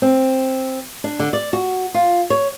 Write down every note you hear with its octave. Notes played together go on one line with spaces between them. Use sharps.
C4
D4
D3
D5
F#4
F4
C#5